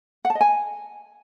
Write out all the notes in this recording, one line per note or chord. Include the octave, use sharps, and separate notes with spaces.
F#5
A5
D#5
G#5